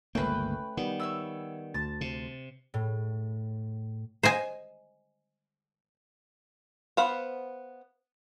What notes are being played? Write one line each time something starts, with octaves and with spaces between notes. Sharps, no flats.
G1 C#2 A3 A#3 C#4 B4 G5
D#3 G3 B3
C#5 E5 E6
D2 A5
C3
A2
C5 D#5 G#5
B3 C5 F5 F#5 B5